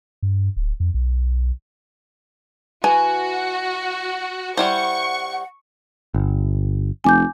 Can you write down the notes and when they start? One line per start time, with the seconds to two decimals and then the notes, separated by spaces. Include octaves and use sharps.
0.23 G2
0.57 D1
0.80 F2
0.94 B1
2.84 E3 F#4 G#5
4.57 G3 E4 C5 F#5 C#6
6.14 G1
7.04 F1 G#5 D6 G6